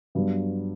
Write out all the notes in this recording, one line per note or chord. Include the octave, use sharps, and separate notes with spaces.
G2 F#3 B3